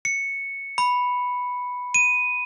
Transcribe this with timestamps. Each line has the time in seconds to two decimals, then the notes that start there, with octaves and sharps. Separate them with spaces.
0.05 C#7
0.78 B5
1.94 D#7